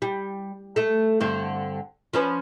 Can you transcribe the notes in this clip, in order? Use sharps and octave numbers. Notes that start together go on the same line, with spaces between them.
G3
A3 A4
G2 D3 C4
F3 C#4 B4